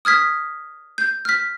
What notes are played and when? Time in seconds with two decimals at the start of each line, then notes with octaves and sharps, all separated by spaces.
0.05 D#6 F6 G#6 B6
0.98 G6
1.25 F6 B6